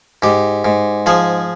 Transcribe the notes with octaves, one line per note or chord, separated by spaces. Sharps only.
G#2 G4
G#2
F3 G#4